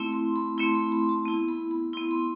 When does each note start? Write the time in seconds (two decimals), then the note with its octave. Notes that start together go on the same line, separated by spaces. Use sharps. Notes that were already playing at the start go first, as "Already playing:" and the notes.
Already playing: A3 C4 E4
0.13 C6
0.36 B5
0.58 A3 C4 E4 C6
0.75 B5
0.92 B5
1.09 A5
1.25 B3 E4
1.48 B5
1.71 B5
1.93 E4 C6
1.97 B3
2.11 B5